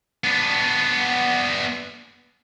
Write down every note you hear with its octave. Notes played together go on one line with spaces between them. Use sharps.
B3 D4